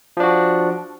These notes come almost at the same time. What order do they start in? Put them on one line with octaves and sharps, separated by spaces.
F3 D4 F#4